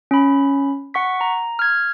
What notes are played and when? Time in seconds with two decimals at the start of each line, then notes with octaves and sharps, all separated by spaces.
0.11 C#4 B5
0.94 F#5 C#6 B6
1.21 A#5
1.59 F6 G#6